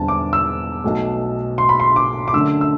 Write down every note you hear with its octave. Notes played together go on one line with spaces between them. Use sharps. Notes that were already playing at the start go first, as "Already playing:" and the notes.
Already playing: E1 E2 D3 G3 C4 A5
D6
E6
B1 B2 A3
C6
B5
C6
D6
D6
F#2 D3 A3 D4 E6
E6